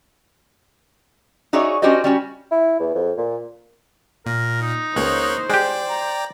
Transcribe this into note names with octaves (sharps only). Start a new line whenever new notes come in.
D#4 F#4 G#4 C#5 D5 E5
C#4 D4 F#4 G4 C5 D#5
G3 C#4 F#4
E4
E2
F2
A#2
A#2 A#4
D#4
C#2 A#3 C5 C#5 F#6
G#3 G4 D5 G5
A#5